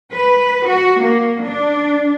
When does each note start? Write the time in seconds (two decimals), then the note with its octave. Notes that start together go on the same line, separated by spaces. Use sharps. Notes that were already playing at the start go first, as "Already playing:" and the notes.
0.14 B4
0.69 F#4
1.02 A#3
1.44 D4